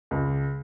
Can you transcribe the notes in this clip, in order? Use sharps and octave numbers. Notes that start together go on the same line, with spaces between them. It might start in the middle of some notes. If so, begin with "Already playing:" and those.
C#2